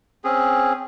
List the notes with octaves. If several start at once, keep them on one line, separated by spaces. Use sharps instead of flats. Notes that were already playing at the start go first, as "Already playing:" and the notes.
C4 C#4 G#4